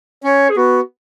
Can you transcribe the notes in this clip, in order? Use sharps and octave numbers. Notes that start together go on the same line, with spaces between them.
C#4 C#5
G#4
B3 F#4